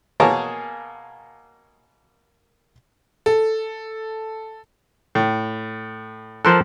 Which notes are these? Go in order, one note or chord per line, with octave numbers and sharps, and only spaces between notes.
B2 A#3 G#4 A#4 C#5 A5
A4
A2
F3 A4 A#4 C5 C6 F#6